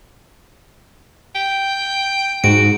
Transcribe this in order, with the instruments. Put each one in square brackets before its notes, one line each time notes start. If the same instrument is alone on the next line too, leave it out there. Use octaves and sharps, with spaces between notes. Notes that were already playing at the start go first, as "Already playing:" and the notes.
[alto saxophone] G5
[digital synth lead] G#2 [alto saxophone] F#4 [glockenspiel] D7